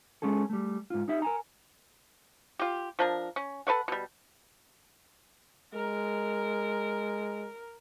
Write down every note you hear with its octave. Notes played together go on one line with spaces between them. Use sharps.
G#3 C#4 G#4 A4
G3 A3
G#2 F4
D#4 G4 E5
A#4 G#5 A#5
F4 G4
F3 D4 A#4
C#4
A4 B4 C#5 F#5
B2 G3
G#3 A#4